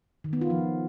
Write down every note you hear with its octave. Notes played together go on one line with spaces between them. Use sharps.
D#3
B3
F4
F3